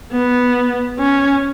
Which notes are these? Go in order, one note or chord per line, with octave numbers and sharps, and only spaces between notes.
B3
C#4